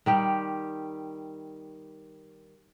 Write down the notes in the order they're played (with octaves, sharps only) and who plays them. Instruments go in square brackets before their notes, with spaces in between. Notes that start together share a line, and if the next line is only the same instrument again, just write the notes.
[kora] D#3 G3 G4